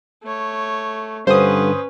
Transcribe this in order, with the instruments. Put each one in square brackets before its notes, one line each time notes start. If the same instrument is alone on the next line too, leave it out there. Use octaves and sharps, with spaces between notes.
[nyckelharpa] A3 C#5
[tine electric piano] G2 D3 [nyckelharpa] C#4 B4 [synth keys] C5 D#6